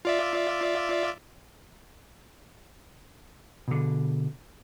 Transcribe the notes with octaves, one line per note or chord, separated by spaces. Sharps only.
F4 D5 E5
B2 D3